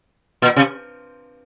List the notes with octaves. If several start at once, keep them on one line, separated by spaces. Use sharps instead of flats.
A#2
C3